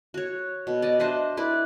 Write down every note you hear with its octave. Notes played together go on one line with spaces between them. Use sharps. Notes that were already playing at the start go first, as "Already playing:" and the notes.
F#4 C#5
B2
D5 D#5
D4 C5 D#5 E5
E4 B4 D5